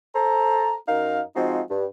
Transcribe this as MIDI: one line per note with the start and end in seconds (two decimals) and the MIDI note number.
0.15 0.75 69
0.15 0.75 72
0.15 0.75 82
0.88 1.21 42
0.88 1.21 63
0.88 1.21 70
0.88 1.21 77
1.36 1.61 53
1.36 1.61 56
1.36 1.61 60
1.36 1.61 63
1.36 1.61 65
1.36 1.61 66
1.70 1.85 43